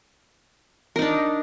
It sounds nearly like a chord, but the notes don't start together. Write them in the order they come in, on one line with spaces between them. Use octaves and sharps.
A#4 D#4 D4